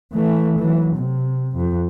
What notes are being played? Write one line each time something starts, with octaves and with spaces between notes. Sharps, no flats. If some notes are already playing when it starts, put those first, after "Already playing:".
E3 A3
E3 F#3
C3
F2